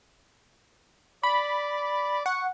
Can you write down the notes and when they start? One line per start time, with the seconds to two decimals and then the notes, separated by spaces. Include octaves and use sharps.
1.23 D5 B5
2.26 F#5 C#6